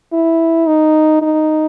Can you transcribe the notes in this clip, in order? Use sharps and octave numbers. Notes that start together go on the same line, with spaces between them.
E4
D#4
D#4